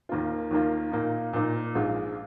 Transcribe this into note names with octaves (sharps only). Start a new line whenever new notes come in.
D#2 D#3 A#3 F4
D#2 D#3 A#3 F4
A#2 A#3 D#4
A#2 A#3 D#4
A#1 G#2 G#3 F4